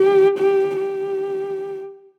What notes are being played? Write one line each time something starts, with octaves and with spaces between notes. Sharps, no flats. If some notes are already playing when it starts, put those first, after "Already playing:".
Already playing: G4
G4
G4